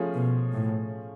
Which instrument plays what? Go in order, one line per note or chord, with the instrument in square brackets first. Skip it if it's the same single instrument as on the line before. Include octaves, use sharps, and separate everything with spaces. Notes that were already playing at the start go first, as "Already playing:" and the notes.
Already playing: [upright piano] F3 A3 C#4 F4 G#4
[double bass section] B2
A2